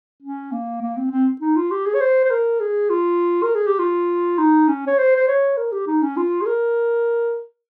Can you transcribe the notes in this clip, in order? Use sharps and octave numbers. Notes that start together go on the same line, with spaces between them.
C#4
A#3
A#3
C4
C4
D#4
F4
G4
G#4
C#5
C5
C5
A#4
G#4
F4
A#4
G#4
G4
F4
D#4
C#4
C#5
C5
C5
C#5
A#4
G4
D#4
C#4
F4
G#4
A#4